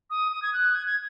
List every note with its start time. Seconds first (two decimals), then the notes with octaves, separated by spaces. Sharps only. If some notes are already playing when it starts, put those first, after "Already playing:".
0.10 D#6
0.32 D#6
0.42 G#6
0.53 F#6
0.75 G#6
0.87 G#6